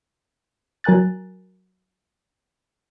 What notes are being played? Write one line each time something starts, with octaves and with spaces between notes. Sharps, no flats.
F#3 A#4 G#5 F#6 A6